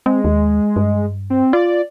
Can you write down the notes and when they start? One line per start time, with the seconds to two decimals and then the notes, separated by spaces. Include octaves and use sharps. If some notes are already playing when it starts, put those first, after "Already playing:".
0.06 G#3 C4
0.25 D#2
0.76 G2
1.30 C4
1.53 F4 D5